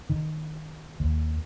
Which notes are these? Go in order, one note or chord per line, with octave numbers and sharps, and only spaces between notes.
D#3
D#2